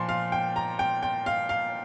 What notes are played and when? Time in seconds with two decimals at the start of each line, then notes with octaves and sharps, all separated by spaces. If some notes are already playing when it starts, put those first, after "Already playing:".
Already playing: A#2 F3 C6
0.09 F5
0.32 G5
0.56 A#5
0.79 G5
1.03 G5
1.26 F5
1.49 F5